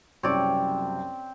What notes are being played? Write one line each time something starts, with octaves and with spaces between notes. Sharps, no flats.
F#1 C2 F#2 C4 C#5 D5